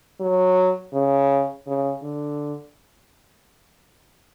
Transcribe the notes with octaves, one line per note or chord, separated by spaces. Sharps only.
F#3
C#3
C#3
D3